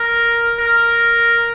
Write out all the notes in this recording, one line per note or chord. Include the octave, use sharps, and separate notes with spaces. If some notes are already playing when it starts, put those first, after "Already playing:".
Already playing: A#4
A#4